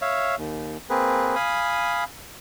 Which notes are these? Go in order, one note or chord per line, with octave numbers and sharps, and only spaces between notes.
C#5 E5 F5
D#2
A#3 C4 G#4 B4
F5 G#5 B5 D#6